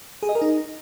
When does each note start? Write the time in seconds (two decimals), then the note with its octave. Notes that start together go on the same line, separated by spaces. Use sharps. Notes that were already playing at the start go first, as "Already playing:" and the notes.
0.23 G#4
0.29 D#5
0.35 A#4
0.42 D#4